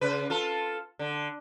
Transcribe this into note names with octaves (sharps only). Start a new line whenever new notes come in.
C#3 B4
F4 A4
D3